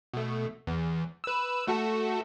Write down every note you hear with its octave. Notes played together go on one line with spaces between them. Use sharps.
B2 A3
E2
B4 E6
A3 F#4 A4